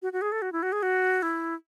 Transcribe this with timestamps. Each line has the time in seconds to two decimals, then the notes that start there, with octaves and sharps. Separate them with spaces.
0.02 F#4
0.13 F#4
0.22 G#4
0.32 A4
0.42 F#4
0.52 E4
0.63 F#4
0.72 G#4
0.83 F#4
1.22 E4